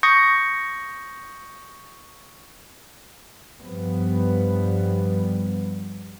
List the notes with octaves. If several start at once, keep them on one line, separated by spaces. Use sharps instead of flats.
C#6 D#6 G6 A#6 C#7
G2 F3 G3 B3